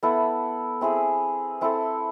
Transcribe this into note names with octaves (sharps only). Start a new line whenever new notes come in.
B3 E4 A4
C4 E4 G#4
C4 E4 A4